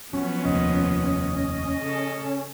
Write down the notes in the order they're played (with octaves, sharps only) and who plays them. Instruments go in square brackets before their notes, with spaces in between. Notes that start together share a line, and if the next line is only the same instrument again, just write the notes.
[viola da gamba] F3 B3 [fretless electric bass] F#3 [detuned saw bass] C#4
[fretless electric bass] F1 D#2 [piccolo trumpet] D#5
[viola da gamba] C#3 A4